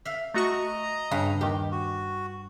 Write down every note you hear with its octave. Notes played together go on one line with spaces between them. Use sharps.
E5 F5
A3 F#4 D#5 A#5 C#6
G2 C#3
D#2 D#3 G4
F#4